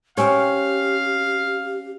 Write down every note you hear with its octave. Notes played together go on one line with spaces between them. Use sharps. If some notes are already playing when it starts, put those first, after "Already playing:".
C4 C#4 G4 C#5 F5